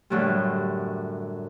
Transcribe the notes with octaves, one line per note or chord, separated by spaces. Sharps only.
F#2 A2 D3 G3